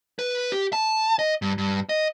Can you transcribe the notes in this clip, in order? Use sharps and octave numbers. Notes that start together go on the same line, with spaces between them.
B4
G4
A5
D#5
G2
G2
D#5